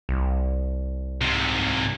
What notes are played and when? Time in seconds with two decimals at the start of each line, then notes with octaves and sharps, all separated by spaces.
0.09 C2
1.22 G#2 C3